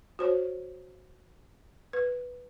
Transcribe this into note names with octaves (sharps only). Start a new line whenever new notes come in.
F#4 C5 C#5
B4